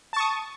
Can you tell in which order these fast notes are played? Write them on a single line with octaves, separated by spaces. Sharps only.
A5 C#6 D#6